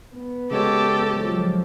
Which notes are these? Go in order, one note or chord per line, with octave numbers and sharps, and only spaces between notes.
B3
C#3 G#3 G4 A4 C#5
F3 F#3